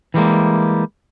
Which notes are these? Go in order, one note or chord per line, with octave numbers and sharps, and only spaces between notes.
E3 G3 G#3 A#3